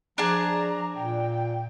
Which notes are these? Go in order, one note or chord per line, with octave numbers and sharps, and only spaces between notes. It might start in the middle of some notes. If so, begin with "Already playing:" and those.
F3 D4 G#4 A5 A#5
A#2 G5